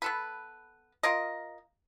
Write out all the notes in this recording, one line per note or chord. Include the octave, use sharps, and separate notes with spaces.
B3 A4 B4
F4 A#4 D#5